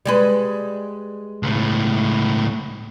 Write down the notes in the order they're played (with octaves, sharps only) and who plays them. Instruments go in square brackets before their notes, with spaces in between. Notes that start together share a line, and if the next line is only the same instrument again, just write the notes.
[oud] G3 G#3 B4
[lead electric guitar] C#2 A2